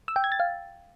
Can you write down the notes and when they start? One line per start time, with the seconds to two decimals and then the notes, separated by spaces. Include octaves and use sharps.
0.08 E6
0.16 G5
0.24 G#6
0.32 A6
0.40 F5